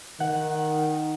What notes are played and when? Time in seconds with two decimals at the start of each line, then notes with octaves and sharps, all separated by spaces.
0.20 D#3 F#5